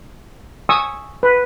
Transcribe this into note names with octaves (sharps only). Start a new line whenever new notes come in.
G#5 C#6 D#6 E6
B4